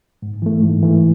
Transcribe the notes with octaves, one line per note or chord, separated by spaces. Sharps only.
G#2
E3 A3
G#2
E3 A3